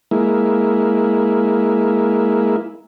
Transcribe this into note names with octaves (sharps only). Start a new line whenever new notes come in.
G#3 A#3 E4